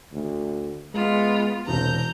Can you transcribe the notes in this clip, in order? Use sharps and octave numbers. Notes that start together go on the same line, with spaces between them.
D2
G#3 B3 F4
E1 C2 A#5 G6